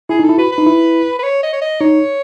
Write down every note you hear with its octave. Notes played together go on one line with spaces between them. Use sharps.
E4 G#4
D#4
A4
E4
F#4 B4
B4
D#4
E4
B4
C#5
D#5
C#5
D#5
D#4 C#5